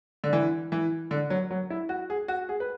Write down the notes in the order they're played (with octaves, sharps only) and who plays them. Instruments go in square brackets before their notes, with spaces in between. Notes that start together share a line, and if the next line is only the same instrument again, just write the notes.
[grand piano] D3
E3
E3
D3
F#3
F#3
E4
F#4
G#4
F#4
G#4
B4